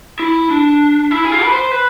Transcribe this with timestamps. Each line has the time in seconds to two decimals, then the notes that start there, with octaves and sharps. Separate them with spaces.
0.19 E4
0.50 D4
1.11 E4
1.25 G#4
1.32 F4
1.43 B4
1.52 C5
1.71 B4